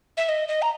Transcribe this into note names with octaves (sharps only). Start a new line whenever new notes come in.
E5
D#5
D#5
A#5